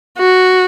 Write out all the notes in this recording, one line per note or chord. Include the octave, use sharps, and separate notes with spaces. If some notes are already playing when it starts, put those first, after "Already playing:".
F#4